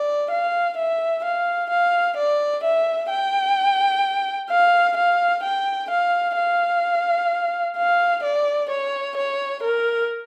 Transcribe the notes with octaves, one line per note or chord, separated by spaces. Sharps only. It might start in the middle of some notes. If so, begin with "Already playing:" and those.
Already playing: D5
F5
E5
F5
F5
D5
E5
G5
F5
F5
G5
F5
F5
F5
D5
C#5
C#5
A#4